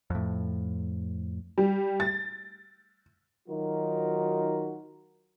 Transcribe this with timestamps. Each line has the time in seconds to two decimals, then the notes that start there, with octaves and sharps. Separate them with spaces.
0.10 F2 A2
1.58 G3
2.00 A6
3.48 D#3 F#3 D#4 F4 F#4 A#4